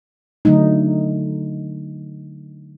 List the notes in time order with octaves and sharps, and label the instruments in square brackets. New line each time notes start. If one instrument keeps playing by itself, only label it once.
[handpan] D3 F#3 A3 D#4